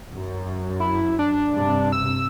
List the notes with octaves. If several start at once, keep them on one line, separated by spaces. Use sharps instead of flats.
F#2
E4
D4
G2 C3
E6